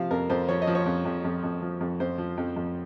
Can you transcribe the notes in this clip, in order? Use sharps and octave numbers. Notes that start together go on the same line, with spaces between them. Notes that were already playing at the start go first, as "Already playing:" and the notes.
Already playing: C3 F3 F5
F2 A#4
F2 C5
F3 C#5
D#5
F3
C#5
F2
F2
F2
F2
F3
F2
F2 C5
F3
F2
F2